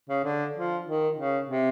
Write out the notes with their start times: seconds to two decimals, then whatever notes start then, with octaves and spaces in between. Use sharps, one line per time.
0.09 C#3
0.24 D3
0.56 F3
0.87 D#3
1.18 C#3
1.49 C3